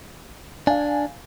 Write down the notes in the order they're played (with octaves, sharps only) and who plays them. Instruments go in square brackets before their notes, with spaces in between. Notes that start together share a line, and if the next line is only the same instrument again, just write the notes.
[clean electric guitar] D4 [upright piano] F5 G#5